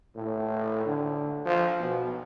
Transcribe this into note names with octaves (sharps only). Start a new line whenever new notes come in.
A2
D3
F3
B2